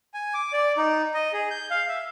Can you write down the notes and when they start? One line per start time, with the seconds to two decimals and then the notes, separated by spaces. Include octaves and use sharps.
0.14 G#5
0.34 D6
0.53 D5
0.77 D#4
1.14 D#5
1.33 G#4
1.51 G6
1.71 F5
1.88 E5